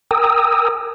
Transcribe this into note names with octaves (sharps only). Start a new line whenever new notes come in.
A#4 G5 G#5 A#5 D#6 E6